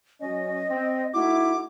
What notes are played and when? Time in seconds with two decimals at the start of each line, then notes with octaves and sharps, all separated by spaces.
0.21 F#3 C#4 D#5
0.68 C4
1.14 A3 D#4 E4 F#4 D6